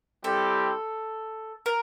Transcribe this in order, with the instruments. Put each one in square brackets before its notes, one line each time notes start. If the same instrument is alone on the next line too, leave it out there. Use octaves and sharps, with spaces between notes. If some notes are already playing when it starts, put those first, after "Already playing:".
[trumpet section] G3 C4 E4 G4 [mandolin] A4
[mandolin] A#4